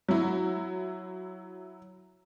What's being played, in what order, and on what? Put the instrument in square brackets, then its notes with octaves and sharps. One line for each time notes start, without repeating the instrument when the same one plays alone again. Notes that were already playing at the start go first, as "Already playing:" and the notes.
[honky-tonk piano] F#3 E4